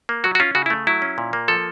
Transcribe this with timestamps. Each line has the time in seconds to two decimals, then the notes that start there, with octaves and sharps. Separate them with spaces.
0.09 A#3
0.24 F#3 F#4
0.35 F#4
0.40 C#4 F4
0.55 C#3 F#4
0.66 E4
0.70 A3
0.87 F#3 E4
1.02 C#4
1.18 A#2
1.33 A#3
1.48 F3 A4